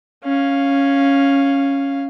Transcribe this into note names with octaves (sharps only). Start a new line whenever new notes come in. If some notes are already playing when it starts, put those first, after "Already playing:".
C#4 F5